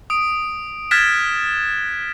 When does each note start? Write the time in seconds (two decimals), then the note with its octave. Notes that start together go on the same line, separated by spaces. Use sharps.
0.10 D#6 D7
0.91 F6 F#6 G#6 A6 B6 E7